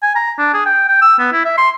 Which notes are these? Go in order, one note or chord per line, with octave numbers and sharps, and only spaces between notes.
G#5
A#5
D4
G#4
G5
G5
E6
B3
E4
E5
C6